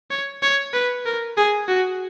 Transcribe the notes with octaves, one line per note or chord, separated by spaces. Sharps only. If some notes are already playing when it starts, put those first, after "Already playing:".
C#5
C#5
B4
A#4
G#4
F#4